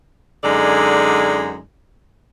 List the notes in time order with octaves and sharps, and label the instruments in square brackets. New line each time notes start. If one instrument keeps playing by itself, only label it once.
[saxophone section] F#2 D3 G#3 D#4 D5